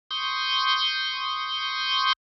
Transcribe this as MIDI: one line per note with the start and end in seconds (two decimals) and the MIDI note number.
0.11 2.13 84
0.11 2.13 85
0.11 2.13 87
0.11 2.13 91